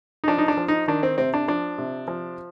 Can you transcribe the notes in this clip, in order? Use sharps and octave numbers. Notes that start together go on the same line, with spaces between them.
D#4
F3 D4
D#4
D4
F3
D#4
D#3 D4
C4
C3 C4
D4
F3 D4
C3
F3